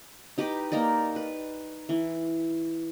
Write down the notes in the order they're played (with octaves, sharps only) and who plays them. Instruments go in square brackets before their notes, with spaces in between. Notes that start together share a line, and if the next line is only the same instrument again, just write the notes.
[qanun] D#4 G4 B4 D6
A#3 D#4 A#4 D5
B4
E3